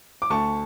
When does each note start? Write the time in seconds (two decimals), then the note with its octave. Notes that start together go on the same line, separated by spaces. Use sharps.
0.22 D6
0.30 D2 A5 C#6